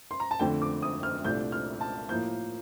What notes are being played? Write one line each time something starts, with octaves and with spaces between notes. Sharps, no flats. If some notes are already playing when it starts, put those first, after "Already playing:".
C6
A#5
A5
F2 D3 A3 G5
D6
D#6
F6
C2 A#2 A3 D4 G6
F6
A5
A2 F3 A#3 G6